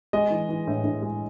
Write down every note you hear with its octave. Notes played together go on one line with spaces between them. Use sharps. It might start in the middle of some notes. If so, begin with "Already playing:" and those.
G#3 D#5
E3
E3
A2
A2
G#3